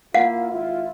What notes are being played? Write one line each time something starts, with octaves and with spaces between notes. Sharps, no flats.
A#3 E4 F4 F5 F#5
G#1 E4 F4